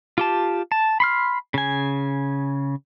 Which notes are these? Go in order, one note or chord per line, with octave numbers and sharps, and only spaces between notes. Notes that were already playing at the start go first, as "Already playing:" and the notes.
F4 G4 A5
A5
B5 C6 F6
C#3 G#5